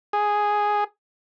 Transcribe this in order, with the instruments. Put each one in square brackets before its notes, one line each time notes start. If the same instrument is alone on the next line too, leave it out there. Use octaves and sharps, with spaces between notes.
[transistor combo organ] G#4